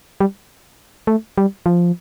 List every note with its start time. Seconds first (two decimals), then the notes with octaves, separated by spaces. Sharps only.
0.20 G3
1.07 A3
1.38 G3
1.66 F3